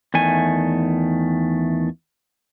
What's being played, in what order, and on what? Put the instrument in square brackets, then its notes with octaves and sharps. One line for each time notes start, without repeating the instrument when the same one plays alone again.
[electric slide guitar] E2 D#3 A3 G#5